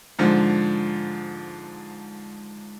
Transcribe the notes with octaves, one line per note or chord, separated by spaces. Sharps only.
G#2 D3 F3